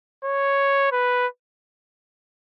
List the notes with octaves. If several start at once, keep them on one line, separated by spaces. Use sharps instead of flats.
C#5
B4